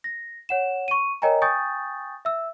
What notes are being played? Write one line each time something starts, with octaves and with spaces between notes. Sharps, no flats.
A#6
C#5 F#5 E7
C#6 D#7
A#4 C#5 D#5 G5 G#5 A#5
G5 G#5 C#6 D#6 G6 A6
E5 E6